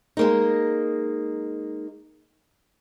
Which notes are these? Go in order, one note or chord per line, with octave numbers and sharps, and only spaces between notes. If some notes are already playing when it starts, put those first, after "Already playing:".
G#3 A#3 D#4